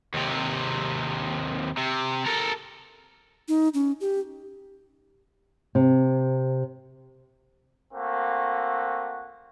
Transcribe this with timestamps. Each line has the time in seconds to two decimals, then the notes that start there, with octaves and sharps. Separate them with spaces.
0.14 D#2 C3
1.78 C3
2.27 A4 A#4
3.48 D#4
3.74 C#4
4.01 G4
5.75 C3
7.93 A3 A#3 C4 F#4